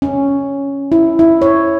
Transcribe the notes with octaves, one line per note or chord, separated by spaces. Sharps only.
C#4
E4
E4
C#5